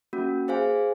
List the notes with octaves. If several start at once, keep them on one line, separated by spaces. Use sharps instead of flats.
A#3 C#4 F#4
G#4 C5 F5 G#5